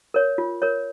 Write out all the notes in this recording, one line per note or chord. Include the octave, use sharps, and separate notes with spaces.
A#4 C#5
F4
A#4 C#5